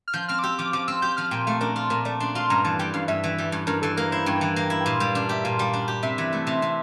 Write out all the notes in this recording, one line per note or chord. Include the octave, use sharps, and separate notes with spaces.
F6
F3 G6
C4 F6
D6
G4 E6
F3 D6
F3 D6
C4 E6
G4 G6
F3 F6
A#2 G5
A3 F5
D4 A#4
F4
A#2 A#4
A3 D5
D4 C6
F4 C6
G2 A#5
E3 A5
G3 G5
G2 F5
G2 E5
E3
G3
G2
G2 A#4
E3 A4
A#3 A#4
E4 C5
G2 G5
E3
A#3
E4
G5
A#2 F5
G3
D4
G4 E5
A#2 F5
G3
D4
G4
C3 E5
E3
A3
C3
C3